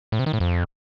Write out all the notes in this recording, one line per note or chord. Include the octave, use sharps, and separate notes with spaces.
A2
C3
D#3
A2
F2